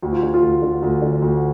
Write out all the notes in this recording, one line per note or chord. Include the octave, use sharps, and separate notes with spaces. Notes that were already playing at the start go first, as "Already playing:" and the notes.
D2 G4
F4
D3
F4
D2
D3
D2
D3
D2